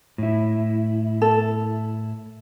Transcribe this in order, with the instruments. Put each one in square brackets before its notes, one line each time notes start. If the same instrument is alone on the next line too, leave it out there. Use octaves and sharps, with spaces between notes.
[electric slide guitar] A2 E4
[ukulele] A4